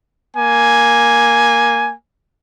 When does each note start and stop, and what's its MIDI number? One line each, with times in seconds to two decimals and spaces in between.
0.36 1.93 58
0.36 1.93 80